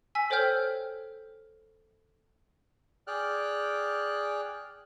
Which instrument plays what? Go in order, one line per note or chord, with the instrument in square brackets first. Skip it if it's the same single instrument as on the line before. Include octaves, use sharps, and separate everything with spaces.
[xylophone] G#5 E6 B6
A4 C5 C#5 G5 F6 G6
[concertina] G#4 D5 G5 F6 F#6